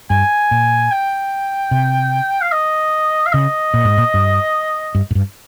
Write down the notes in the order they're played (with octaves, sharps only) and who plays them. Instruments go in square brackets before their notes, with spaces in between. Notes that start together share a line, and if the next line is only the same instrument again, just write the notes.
[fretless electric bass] G2 [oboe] G#5
[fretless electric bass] A#2
[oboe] G5
[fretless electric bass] C3
[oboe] F5
D#5
F5
[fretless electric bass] C#3 [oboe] D#5
[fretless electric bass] A#2
G#2
A#2
G2
G2
G#2
G2